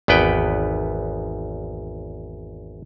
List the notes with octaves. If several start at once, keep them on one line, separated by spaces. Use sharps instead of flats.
G#1 E2 B3 B4 G5